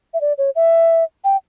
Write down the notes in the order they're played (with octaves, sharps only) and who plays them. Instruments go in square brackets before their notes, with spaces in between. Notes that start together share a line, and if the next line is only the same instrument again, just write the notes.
[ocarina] E5
D5
C#5
E5
G5